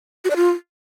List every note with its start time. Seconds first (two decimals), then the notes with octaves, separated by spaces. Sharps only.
0.25 F#4
0.30 D5
0.36 F4